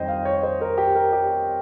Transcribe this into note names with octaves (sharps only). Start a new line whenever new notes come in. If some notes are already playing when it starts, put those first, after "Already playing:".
Already playing: F2 D#3 G3 C5 D#5 G5
F5
C#5
C5
A#4
G4
A#4
G4